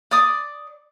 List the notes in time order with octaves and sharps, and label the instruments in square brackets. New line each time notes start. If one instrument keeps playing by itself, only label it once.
[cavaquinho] D5 D6 D#6